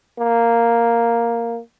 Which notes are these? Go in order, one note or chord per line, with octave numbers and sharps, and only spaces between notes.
A#3